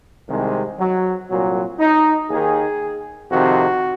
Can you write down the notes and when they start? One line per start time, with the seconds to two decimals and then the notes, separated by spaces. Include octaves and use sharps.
0.28 C2 C3 D#3 G#3
0.79 F#3
1.29 C2 A#2 F#3
1.79 D#4
2.29 D#2 D#3 G#4
3.30 F2 C3 D#3 F#4